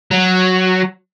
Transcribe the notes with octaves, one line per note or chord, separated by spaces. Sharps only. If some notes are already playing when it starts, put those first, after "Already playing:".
F#3